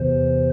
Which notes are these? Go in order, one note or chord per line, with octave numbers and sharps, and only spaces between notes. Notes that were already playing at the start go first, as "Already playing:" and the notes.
Already playing: E2 C3 E3 C5